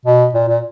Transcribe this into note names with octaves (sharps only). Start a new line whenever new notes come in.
B2
A#2
A#2